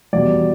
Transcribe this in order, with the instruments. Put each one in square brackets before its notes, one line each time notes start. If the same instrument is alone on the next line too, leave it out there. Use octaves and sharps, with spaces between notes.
[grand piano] E2 B2 G3 D5